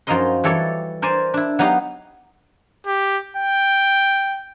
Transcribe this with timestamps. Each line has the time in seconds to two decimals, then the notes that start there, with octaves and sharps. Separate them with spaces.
0.07 F#2 F3 D#4 A#4 D#5 C6
0.44 E3 G3 A4 C#5 D5
1.02 A#4 C5 D5 G#5
1.34 D4 E4
1.59 F#3 B3 D#4 G4 F5
2.86 G4
3.37 G5